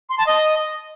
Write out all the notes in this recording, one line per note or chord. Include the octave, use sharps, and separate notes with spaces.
C6
A5
D#5